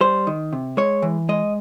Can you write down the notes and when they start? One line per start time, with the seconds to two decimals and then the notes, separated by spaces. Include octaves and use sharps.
0.01 G3 C5
0.27 D#3
0.53 C3
0.77 G#3 C#5
1.02 E3
1.29 G#3 D#5